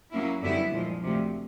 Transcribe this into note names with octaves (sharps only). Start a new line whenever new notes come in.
F#3 A#3 C#4 E4
F#2 D3 G3 B3 E4
A#2 F3 G#3
D2 C3 F3